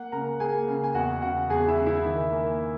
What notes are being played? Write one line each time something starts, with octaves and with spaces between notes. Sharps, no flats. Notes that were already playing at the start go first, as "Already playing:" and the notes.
Already playing: A#3 F#5 F#6
C#3 A#4 A#5
A#3 G#4 G#5
C#3
G#5
E2 F#4 F#5
C#3 F#4 F#5
E2 G#4 G#5
E4 E5
C#3
E4 E5
D#3
A#3